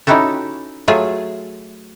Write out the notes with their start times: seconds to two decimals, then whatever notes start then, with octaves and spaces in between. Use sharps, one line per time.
0.07 C#4 D#4 E4 F#4 G4 A4
0.88 F#3 A3 F4 G#4